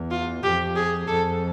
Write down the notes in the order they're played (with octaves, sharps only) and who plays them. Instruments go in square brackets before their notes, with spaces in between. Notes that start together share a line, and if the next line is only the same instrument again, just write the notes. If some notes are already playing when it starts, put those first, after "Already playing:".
Already playing: [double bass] E2
[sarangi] F4
[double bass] F2 [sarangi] G4
[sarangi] G#4
[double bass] F2 [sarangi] A4